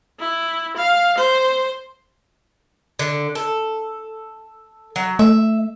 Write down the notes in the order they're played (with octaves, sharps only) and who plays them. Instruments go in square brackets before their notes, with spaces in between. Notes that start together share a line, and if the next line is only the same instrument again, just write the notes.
[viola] E4
F5
C5
[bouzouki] D3
A4
F#3
[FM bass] A3 [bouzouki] E5